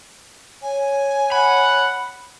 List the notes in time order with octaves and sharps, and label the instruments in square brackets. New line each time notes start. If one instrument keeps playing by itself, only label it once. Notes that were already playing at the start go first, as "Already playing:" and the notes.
[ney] C#5 [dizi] G#5
[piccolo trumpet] F#5 [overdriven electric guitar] B5